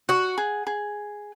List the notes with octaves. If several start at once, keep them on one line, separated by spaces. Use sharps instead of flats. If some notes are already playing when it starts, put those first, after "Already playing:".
F#4 F#5
G#4
G#4